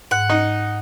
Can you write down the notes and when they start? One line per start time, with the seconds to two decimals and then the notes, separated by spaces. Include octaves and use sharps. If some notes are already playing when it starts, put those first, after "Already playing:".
0.11 G#2 F#5
0.30 D#4